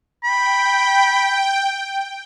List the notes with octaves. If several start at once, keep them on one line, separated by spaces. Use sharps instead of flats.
G5 B5